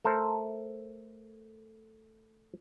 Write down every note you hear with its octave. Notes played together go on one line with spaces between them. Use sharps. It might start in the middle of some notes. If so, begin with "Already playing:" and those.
A3 A4 A#4 C5